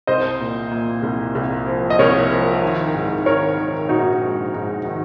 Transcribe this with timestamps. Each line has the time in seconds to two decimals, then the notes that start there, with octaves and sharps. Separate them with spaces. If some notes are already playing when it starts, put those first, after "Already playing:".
0.07 C2 C5 D#5
0.39 A#2
0.71 A#2
1.03 C2
1.35 C2
1.66 F3
1.90 D#5
1.99 C2 A#4 C#5
2.30 F3
2.62 D#3
2.95 G#2
3.26 D#3 A#4 C#5
3.58 D#3
3.89 A#1 D#4 F#4
4.22 G#2
4.54 G#2
4.85 D#3